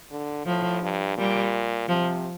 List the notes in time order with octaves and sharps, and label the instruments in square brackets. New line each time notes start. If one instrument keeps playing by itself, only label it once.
[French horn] D3
[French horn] A2 [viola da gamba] F3
[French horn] G2
[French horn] A#2 [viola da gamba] G3
[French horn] C3 [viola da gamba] F3